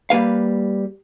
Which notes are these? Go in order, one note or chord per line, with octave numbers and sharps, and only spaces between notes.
G3 A#3 B4 F5